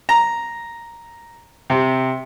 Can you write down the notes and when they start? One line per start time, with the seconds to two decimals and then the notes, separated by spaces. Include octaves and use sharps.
0.09 A#5
1.70 C3